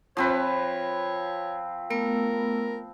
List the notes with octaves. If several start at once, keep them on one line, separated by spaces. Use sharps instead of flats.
F3 C4 B4 C#5
A3 B3 A#4 E6